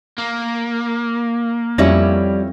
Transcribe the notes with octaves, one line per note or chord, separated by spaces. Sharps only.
A#3
F2 G3 C#4 E4 C#5 D5 A#6